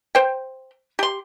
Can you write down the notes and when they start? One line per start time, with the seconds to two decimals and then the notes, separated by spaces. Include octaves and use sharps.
0.15 C5 G5
0.99 G4 C6